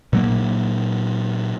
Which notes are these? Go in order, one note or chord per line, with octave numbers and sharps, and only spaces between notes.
A#2 F#3 A#3